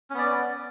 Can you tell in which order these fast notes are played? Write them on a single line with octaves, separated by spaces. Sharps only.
C#4 B3 D5